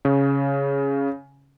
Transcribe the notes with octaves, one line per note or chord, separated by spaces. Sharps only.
C#3